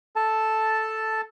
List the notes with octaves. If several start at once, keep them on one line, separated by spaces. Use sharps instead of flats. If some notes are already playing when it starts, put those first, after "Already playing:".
A4 A5